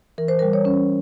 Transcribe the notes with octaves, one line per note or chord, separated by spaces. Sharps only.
E3 A#4
C5
G3 A#4
C#5
C#4